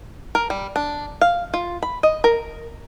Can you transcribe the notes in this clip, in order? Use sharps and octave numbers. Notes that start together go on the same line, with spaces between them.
A#4
G3
D4
F5
F4
B5
D#5
A#4